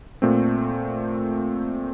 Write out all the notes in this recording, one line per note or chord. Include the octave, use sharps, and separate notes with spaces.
A#2 A3 C4